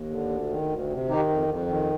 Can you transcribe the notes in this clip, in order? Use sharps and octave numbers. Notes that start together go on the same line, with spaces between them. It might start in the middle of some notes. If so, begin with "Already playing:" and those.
Already playing: D#2
D3
D2
D#3
D2
C3
D#3 D#4 G4
F2
F2
D#3